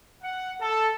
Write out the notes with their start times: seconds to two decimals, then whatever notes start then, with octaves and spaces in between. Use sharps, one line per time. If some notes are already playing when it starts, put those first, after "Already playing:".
0.22 F#5
0.60 A4